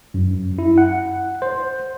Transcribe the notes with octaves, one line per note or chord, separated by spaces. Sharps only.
F#2
E4
F#5
C5